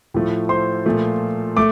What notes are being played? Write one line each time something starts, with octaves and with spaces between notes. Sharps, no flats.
A2 F3 A3
C5 C6
A#2 F3 A3
A3 D6